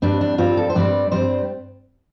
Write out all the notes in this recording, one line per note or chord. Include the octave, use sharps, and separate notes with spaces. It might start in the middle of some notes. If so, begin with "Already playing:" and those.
G2 G3 C4 D4
D4
G2 G3 C4 F4
A4
C5
G2 G3 C4 D5
G2 G3 C4 C5